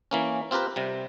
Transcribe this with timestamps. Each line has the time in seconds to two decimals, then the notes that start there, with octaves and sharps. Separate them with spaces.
0.11 E3 A#3 C#4
0.51 C4 F4 G4 A#4 B4
0.76 C3 G3